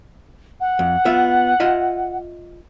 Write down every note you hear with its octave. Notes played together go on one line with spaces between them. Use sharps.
F#5
F2
B3 F4 E5
F4 D#5 E5